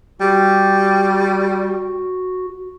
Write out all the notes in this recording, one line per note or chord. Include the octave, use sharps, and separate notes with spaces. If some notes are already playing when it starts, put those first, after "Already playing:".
G3 F#4